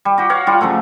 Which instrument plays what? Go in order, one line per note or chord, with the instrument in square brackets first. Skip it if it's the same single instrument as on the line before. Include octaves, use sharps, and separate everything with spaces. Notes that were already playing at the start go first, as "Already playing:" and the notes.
[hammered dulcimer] G3
F#4 G4
F#4 C#5 F5 F#5
G3 F4 F#5
C#3 F3 F#3 A3